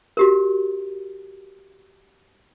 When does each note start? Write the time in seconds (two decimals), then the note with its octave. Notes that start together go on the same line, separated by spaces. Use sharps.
0.17 F#4 G4 A#4